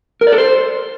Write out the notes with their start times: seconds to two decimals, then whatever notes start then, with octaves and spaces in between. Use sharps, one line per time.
0.21 A#4
0.27 D5
0.33 A4
0.38 C5